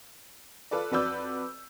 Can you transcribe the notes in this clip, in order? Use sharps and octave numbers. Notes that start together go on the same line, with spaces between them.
F4 A4 B4 D5
F2 F#4 B4 D5 E6 G6